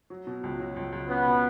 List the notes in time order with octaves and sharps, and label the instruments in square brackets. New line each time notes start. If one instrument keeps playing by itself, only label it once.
[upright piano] F#3
B2
C#2
F#3
C#2
C#2
[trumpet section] B3 [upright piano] C#4
[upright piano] B2